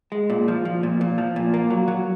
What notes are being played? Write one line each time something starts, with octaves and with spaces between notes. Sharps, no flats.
G#3
A#2
F3
F3
A#2
A#2
F3
A#2
A#3
F#3
F#3